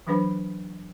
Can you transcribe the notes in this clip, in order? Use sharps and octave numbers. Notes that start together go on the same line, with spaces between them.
E3 F#3 D4 B4 C5 B5